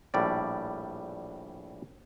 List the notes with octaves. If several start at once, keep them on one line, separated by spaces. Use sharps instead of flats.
A#1 A2 G3 D5